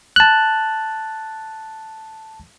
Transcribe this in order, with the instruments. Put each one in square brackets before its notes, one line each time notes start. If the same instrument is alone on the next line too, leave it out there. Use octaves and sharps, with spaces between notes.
[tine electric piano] A5 F#6